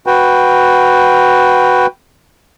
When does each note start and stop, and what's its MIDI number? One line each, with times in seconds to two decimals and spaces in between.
0.06 1.86 66
0.06 1.86 71
0.06 1.86 79